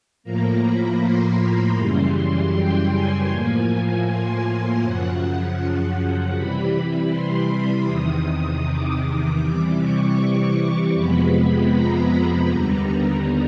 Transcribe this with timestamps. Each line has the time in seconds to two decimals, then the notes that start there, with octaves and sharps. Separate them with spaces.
0.24 A2 F3 A#3 A#5
0.62 B5
1.00 C6
1.76 F#2 C#3 E3 G3
2.53 G5
2.90 G#5
3.29 A2 F3 A#3
4.06 C6
4.81 F#2 C#3 F3 F#5
5.97 F#5
6.35 C3 E3 G3 B5
7.11 C6
7.87 E2 C3 D#3 D#6
8.64 D6
9.02 D#6
9.40 C3 E3 G3 D6
9.79 C#6
10.93 F2 C3 F3 G#3 B3 B5
11.70 A#5
12.46 D#2 D3 G3 B3